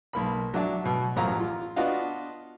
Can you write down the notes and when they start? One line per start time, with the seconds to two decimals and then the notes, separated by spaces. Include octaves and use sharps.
0.13 B1 A#3 B5
0.54 F#3 D4 E5 A5
0.84 B2 F#3
1.16 A1 F#2 F3 F#3 F5 A#5
1.40 F4
1.76 B3 D4 F4 F#4 D#5 F5